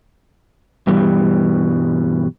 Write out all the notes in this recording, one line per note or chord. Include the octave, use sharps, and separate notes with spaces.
G2 B2 E3 G3